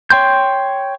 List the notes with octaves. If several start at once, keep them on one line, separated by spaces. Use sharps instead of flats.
C#5 G5 C6 G6